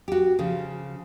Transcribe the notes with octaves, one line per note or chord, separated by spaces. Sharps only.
F#4 G4
C#3 F3